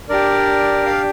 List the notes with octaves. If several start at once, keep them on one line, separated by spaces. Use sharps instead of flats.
D4 G4 A#4 D5
D5 F5